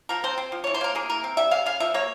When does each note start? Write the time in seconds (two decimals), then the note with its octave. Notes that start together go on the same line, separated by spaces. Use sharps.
0.09 F3 A#4
0.24 C4 C5
0.38 C4
0.52 F3
0.64 E3 C#5
0.74 C5
0.81 A#3 A#4
0.95 A#3 G#4
1.10 E3 A#4
1.24 C4
1.37 G3 E5
1.51 C#3 F5
1.66 C#3 F5
1.80 F3 E5
1.94 A#3 C#5